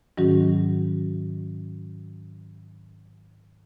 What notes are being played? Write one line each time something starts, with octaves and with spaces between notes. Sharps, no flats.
G#2 D#3 F#3 C#4 F#4